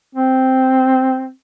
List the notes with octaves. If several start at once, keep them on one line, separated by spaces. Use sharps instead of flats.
C4